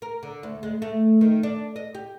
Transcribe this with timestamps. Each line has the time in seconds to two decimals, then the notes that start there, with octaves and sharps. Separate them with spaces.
0.02 A#4
0.23 D3
0.43 D2
0.63 G#3
0.82 A3
1.21 D#3
1.43 D4
1.76 D#5
1.95 G4